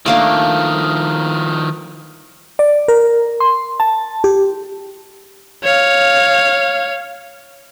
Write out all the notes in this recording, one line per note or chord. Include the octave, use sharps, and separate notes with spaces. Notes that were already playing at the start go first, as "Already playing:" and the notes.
D#3 F3 A3 A#3 D4
D5
A#4
C6
A5
G4
C#5 F5